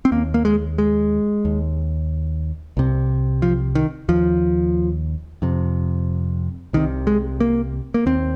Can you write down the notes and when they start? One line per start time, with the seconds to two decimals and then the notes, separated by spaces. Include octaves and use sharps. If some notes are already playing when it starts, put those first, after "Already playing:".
0.05 C4
0.12 D#2 A#3
0.34 A#3
0.45 G#3
0.78 G#3
1.45 D#2
2.77 C2 C3
3.42 F3
3.75 D#3
4.09 D#2 F3
5.42 F2 C3
6.73 C2 C3 D#3
7.07 G#3
7.40 A#3
7.94 A#3
8.06 D#2 C4